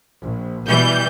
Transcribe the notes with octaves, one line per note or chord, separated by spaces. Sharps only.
A#1
B2 E3 G3 G6